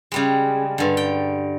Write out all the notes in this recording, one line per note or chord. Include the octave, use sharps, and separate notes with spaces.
C#3 G3 G#3
G2 D3
G5